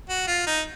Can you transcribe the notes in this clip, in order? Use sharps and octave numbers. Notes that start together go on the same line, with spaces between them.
F#4
F4
D#4